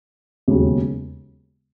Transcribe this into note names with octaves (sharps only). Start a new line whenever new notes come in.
E1 D#2 C#3 F#3